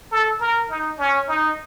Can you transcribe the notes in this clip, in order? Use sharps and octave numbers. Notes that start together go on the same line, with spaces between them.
A4
A#4
D#4
C#4
D#4